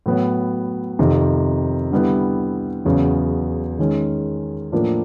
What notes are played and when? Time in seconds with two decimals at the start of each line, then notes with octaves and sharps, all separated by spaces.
0.06 A2 F#3 B3
0.99 F2 C3 D#3
1.92 D3 G3 B3 E4
2.85 E2 C#3 F#3
3.79 D#3 G#3 C#4
4.72 A2 F3 A#3 D4